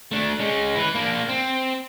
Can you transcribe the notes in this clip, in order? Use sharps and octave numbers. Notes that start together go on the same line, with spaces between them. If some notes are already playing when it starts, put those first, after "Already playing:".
A3 D4
G#3 C#4
E4 B4
A#3 D4
C4